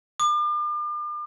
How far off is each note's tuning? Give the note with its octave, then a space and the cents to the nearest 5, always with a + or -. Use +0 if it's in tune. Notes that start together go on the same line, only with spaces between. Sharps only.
D6 +40